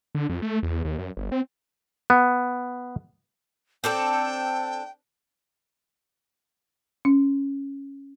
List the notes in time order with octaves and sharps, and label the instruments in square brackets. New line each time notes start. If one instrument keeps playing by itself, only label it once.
[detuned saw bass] D3
F2
A3
E2
D#2
F#2
G1
C4
[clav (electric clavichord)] B3
[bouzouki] C4 D4 A4 [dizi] G5
[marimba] C#4